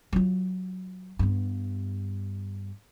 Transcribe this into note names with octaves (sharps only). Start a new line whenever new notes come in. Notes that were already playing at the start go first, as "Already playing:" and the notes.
F#3 F4
G2 B3